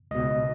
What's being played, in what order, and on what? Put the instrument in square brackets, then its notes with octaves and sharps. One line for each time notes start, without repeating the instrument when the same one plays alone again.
[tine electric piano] C#2 B2 D#5